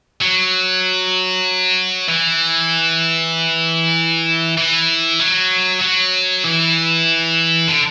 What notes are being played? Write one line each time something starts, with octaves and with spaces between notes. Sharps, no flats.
F#3
E3
E3
F#3
F#3
E3
D3